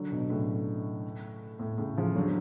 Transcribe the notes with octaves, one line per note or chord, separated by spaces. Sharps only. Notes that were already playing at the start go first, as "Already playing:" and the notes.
Already playing: D3 F#3
B2 D3
A2 C#3
A2
A2 C#3
C#3 F3
D3 F#3